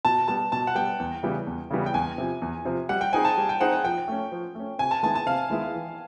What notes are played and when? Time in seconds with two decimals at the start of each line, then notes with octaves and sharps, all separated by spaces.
0.05 B2 A5
0.28 G3 B3 A5
0.52 B2 A5
0.67 F#5
0.75 G3 B3 G5
1.00 E2
1.23 C#3 E3 G3 B3
1.47 E2
1.71 C#3 E3 G3 B3
1.86 G5
1.94 E2 G#5
2.18 C3 F3
2.42 E2
2.65 C3 F3
2.89 G3 F#5
3.01 G5
3.13 C4 D#4 G#4 C5 G#5
3.25 A5
3.37 G3
3.49 G5
3.60 C4 D#4 G#4 C5 F#5
3.73 F#5
3.84 F3 G5
4.08 A3 C#4
4.32 F3
4.55 A3 C#4
4.79 C3 G#5
4.91 A5
5.03 D#3 G#3 B3 E4 A5
5.15 A5
5.26 C3 F5
5.50 D#3 G#3 B3 E4
5.74 E3